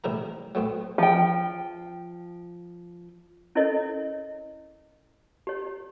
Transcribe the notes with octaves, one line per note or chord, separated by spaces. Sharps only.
A1 C3 E4 A#4 A#5
F#3 A3 B3 C4
F3 G5
C#4 E4 A4 A#4 C#5 D#5
G4 C#5